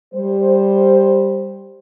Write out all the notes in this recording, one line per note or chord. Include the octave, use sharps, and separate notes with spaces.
G3 C5